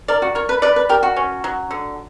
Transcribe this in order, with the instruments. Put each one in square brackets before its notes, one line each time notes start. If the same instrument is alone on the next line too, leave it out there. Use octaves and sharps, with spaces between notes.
[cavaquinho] A#4 [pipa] D5
[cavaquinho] F#4
[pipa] A#4 [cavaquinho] C#5
[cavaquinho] B4
[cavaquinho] B4 [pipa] D5
[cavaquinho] B4
[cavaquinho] G4 [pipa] A#4
[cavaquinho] F#4
[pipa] C#4
F#3
D3